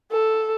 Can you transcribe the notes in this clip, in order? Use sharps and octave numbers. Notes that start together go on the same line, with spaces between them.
A4